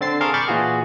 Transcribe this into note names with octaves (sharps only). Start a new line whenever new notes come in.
D3 C4 A6 C7
G#4 A#4 F5 A5 C6 C#6
B5 C#6 D6 F6 G6 A6
A#2 E3 F4 F#4 G#4